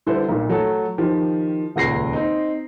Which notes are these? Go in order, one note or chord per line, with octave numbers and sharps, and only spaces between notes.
D3 G3 E4 A4 B4 C5
B1 A#2
F#3 A3 A4
D#3 F3 G4
D#1 C#2 A#6 C7
C4 D#4